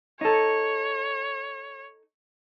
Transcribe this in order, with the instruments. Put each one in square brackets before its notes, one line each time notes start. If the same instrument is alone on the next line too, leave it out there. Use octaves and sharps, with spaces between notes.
[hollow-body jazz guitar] D#4 A4 [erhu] C#5